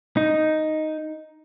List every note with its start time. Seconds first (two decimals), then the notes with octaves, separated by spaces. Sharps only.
0.17 D#4